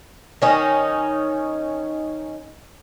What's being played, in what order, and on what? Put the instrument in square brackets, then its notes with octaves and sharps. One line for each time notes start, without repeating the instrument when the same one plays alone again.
[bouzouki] D#3 C#4 D#4